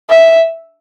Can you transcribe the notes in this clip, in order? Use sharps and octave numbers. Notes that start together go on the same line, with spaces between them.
E5